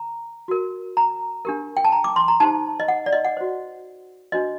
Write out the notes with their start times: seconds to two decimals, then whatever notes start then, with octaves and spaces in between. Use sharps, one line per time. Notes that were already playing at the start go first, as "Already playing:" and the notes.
Already playing: A#5
0.48 F#4 A#4
0.97 A#5
1.45 D4 G4 A#4
1.77 G5
1.85 A5
1.92 A#5
2.04 D6
2.16 C6
2.28 A#5
2.40 D#4 G4 C5 A5
2.80 D#5
2.88 F#5
3.06 D5
3.13 D#5
3.25 F#5
3.37 F#4 C5
4.32 D4 F#4 C5 D#5